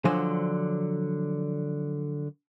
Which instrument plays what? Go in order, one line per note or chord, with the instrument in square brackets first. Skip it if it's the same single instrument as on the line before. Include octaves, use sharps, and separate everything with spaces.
[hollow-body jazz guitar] D3 F3 F#3 C5 G#5